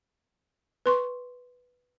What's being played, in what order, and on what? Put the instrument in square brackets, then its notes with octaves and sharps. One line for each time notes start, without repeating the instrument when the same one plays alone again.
[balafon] B4 C6 C#6